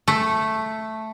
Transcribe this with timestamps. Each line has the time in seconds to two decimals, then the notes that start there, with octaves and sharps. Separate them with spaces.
0.08 A3